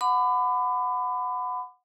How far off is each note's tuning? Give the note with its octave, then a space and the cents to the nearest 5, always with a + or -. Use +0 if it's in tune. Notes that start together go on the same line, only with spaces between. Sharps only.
F#5 -15 B5 +30 D6 +30